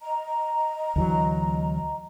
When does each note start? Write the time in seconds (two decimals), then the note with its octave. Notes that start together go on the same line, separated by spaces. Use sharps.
0.01 D#5 A#5
0.96 D2 E3 F#3